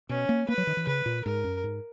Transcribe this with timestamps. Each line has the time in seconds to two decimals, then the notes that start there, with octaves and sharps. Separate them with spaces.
0.09 B2 C#4
0.29 A#3
0.49 A#3 B4
0.58 F#3
0.67 D#3
0.77 E3
0.87 C#3 B4
1.06 A#2
1.25 G#2 A#4
1.44 F#2
1.64 G#2